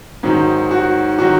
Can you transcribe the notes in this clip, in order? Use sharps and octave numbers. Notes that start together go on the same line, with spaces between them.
G#2 D#3 F#3
F#4
D#3 F#3 F#4